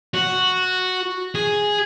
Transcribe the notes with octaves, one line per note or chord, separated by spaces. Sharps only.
F#4
G#4